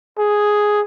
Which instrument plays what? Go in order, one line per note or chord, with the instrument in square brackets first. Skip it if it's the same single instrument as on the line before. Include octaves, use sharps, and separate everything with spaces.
[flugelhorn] G#4